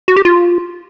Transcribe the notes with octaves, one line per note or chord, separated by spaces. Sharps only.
F#4
G4
F4